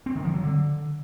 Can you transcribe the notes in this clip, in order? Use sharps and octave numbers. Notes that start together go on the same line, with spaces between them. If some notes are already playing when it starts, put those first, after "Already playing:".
C4
D#3
F3
F#3
D3